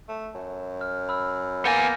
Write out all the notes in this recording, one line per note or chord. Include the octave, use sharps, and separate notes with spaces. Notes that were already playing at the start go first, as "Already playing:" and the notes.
A3
F#2
F6
B5 E6 F6
A#3 B3 G#5 G6 A6 A#6